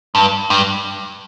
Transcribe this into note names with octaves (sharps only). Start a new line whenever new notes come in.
G2
G2